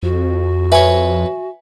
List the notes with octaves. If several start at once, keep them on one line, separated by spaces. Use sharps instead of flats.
F2 F#4
B4 C#5 E5 G#5